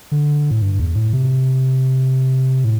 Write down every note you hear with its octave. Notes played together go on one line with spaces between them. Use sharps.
D3
A2
G2
E2
A2
C3
A2